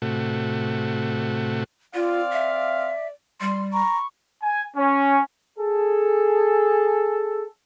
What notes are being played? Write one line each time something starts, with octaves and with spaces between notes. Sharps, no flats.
A2 C3 A3 F#4
C4 F4 D5 F5
E5
G3 C6
A#5 B5 C#6
G#5
C#4
G#4 A4